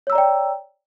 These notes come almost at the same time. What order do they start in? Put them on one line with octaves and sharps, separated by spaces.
C#5 E6 A#5 D5 G5